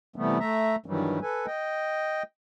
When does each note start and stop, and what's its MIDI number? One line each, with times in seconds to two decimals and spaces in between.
0.16 0.38 48
0.16 0.38 52
0.16 0.38 55
0.16 0.38 57
0.16 0.38 59
0.40 0.76 57
0.40 0.76 76
0.40 0.76 82
0.86 1.19 43
0.86 1.19 51
0.86 1.19 52
0.86 1.19 54
0.86 1.19 55
1.22 1.46 69
1.22 1.46 71
1.22 1.46 80
1.46 2.23 75
1.46 2.23 79